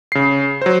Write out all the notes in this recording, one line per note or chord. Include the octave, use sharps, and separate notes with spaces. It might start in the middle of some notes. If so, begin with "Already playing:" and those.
C#3 C7
F#3 C5